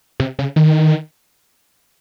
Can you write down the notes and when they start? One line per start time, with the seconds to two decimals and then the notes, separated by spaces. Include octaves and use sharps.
0.20 C3
0.39 C#3
0.56 D#3